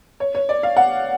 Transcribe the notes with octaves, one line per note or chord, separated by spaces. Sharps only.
C#5
C#5
D5
F5
F#5